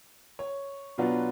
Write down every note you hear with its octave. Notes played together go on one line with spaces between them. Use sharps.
C#5
B2 F#3 B3 D4 F4